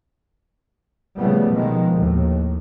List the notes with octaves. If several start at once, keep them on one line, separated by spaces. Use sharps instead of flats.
C#3 F3 G3 A3 B3
B2 D#3 F3 G#3
D#2 A2